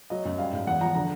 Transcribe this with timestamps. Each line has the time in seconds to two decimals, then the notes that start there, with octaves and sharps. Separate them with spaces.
0.10 F#3 D#5
0.25 F#2
0.38 G3 F5
0.53 G#2
0.67 E2 F#5
0.81 F3 A#5
0.95 D3 A#5